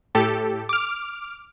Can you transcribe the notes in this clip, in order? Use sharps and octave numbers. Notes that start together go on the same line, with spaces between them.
A2 G4 A4
D6 F6